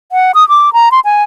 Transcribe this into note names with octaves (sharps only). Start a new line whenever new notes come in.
F#5
D#6
D6
A#5
C6
G#5